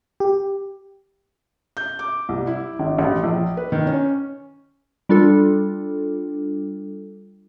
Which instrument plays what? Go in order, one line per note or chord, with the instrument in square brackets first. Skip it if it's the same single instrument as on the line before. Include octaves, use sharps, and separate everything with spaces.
[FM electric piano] G4
[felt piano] G6
D6
C2
E4
G#1
A1
A#1
B4
D#3
C#4
[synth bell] G3 D4 F4 A4